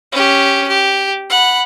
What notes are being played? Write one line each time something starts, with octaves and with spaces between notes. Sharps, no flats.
C#4 G4
G4
F#5 B5